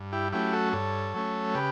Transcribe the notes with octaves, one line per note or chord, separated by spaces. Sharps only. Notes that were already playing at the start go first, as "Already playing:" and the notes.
Already playing: G2
E4 G4
F#3 A3 C#4 E4 G4
F#4 A4
G2 A4 C#5
F#3 A3 C#4
C#3 G4 B4